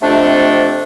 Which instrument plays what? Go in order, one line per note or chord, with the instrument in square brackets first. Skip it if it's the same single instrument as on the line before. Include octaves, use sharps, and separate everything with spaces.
[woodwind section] F2 C3 A3 D4